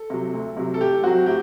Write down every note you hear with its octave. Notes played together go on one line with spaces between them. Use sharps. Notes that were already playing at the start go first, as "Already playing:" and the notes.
Already playing: A4
C3 F#3
D2
C3 F#3
A4
A2 G4
F#3 C4 F#4
A2 G4